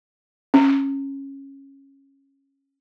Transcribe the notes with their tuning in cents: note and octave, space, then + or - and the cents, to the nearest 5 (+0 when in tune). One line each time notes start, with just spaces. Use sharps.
C#4 -15